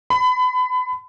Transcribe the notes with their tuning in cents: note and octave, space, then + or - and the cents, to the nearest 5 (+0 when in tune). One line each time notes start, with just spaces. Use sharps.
B5 +30